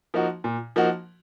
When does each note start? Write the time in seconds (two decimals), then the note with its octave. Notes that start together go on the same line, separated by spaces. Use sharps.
0.14 F3 A#3 D#4 F#4
0.44 A#2
0.76 F3 A#3 D#4 F#4